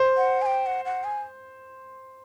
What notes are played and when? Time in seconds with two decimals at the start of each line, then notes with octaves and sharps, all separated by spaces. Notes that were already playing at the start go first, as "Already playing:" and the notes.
Already playing: C5
0.17 F#5
0.42 G#5
0.46 G5
0.66 F#5
0.85 F#5
1.04 G#5